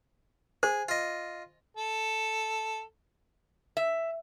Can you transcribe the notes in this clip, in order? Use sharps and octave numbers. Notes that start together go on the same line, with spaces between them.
G#4 C5
F4 D#5
A4
E5